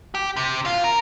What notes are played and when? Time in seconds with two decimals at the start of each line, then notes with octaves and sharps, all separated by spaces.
0.15 G4
0.37 C3
0.66 F4
0.84 A#4